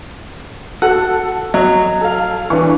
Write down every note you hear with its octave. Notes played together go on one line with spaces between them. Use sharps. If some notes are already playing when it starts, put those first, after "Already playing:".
F#4 A4 F#5
F#3 D#5
A4 F5
E3 D4 C#6